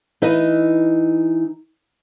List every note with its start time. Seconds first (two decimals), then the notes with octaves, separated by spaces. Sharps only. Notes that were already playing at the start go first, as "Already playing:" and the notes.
0.22 E3 D#4 E4 B4 D#5